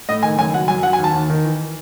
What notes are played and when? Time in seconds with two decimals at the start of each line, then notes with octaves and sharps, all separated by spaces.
0.09 A2 D#5
0.23 D#3 G#5
0.38 F#1 G#5
0.53 F#3 F#5
0.68 F#2 G#5
0.83 F#3 F#5
0.93 G#5
0.98 D#2
1.04 A5
1.14 D#2
1.30 D#3
1.44 E3